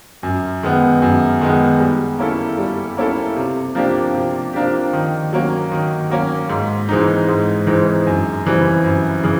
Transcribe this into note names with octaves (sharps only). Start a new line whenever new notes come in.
F#2
D#3 G#3 B3
F#2
D#3 G#3 B3
G3
A#3 C#4 E4 A4
G3
A#3 C#4 E4 A4
C3
F3 A#3 D4 G4
C3
F3 A#3 D4 G4
D#3
F#3 A#3 C#4
D#3
F#3 A#3 C#4
G#2
E3 G#3 C4 D#4
G#2
E3 G#3 C4 D#4
F#2
C#3 E3 G3 C4
F#2
C#3 E3